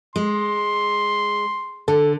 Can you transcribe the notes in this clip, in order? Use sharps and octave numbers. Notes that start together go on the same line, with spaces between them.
G#3 C6
D3 A4